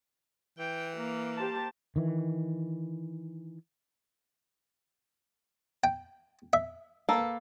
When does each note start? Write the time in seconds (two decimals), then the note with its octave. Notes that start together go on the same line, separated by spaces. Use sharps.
0.59 E3 G5
0.97 A#3
1.37 G4 C5 A5
1.96 D#3 E3
5.84 G5
6.53 E5
7.09 A#3 A4 B4